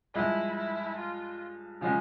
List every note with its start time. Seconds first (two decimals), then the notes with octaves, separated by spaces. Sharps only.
0.14 G2 F3 G#3 E4
0.56 E4
0.99 F4
1.81 C#3 F3 G#3 C#4